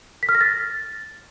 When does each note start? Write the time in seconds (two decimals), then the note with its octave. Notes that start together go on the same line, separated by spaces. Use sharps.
0.23 B6
0.29 F6
0.35 A#6
0.41 A6